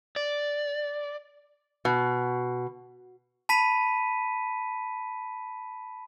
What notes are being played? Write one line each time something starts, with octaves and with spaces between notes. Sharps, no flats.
D5
B2
A5 B5 B6 D#7